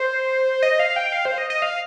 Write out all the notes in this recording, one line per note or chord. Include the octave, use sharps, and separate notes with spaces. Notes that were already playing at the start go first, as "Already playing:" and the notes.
Already playing: C5
D#5
F5
G5
F5
C5
D#5
D#5
F5